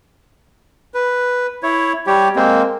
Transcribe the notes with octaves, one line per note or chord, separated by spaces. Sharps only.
B4
E4 C#5
G3 G4 C#5
G#3 A#3 C4